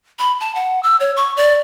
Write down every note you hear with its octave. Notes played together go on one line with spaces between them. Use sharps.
B5
A5
F#5
E6
C#5
C#6
D5